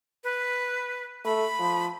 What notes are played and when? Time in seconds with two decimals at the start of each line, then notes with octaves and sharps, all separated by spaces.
0.24 B4
1.25 A3 B5
1.59 F3